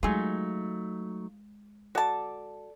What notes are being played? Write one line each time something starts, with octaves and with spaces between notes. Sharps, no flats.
F#3 G#3 A3 D#4 F4 G#4
F#4 A4 D5 A5